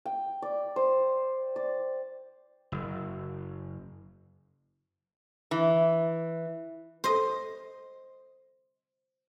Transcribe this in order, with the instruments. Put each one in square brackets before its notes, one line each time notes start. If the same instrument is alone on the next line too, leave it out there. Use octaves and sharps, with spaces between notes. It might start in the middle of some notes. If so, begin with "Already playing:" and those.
[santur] G5
D5
C5
D5
[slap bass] F#1
[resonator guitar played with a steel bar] E3
[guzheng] C5 D#5